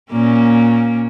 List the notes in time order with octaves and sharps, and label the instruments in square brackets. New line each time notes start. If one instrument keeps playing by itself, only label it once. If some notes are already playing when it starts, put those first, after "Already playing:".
[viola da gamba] A#2 A#3 C#4